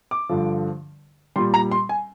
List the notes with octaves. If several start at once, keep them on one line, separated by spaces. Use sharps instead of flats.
D6
G2 D3 F3
A#2 G3 C6
A#5
C6
G#5